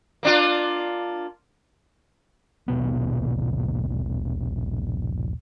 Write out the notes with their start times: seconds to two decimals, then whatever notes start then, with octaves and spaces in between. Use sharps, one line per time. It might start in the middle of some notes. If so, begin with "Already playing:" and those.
0.23 A#3 D4 F4
2.68 D#1 A#1 B2 B3